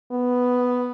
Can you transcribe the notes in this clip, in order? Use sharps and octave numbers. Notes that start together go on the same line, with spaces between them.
B3